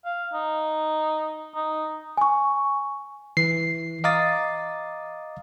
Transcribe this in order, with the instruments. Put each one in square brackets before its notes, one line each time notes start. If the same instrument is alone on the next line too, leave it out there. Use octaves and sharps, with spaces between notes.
[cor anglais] F5
D#4
D#4
[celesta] G#5 C#6
[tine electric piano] E3 C7
D#5 F5 A#5 D6 D#6 A6